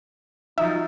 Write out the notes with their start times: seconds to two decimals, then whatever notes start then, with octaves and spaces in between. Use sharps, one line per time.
0.58 F3 F#3 D#4 E5